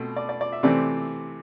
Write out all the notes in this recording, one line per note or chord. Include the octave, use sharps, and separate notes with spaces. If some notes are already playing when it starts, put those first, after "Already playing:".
Already playing: B2 A3 C4
D5
D5
D5
E5
C3 E3 A3 C4 D5